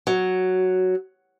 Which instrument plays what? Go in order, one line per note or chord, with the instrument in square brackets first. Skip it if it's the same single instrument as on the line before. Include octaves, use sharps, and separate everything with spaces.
[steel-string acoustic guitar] F#3